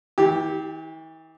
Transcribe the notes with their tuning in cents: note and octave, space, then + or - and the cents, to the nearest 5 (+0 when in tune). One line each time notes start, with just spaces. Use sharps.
E3 -45 G4 +0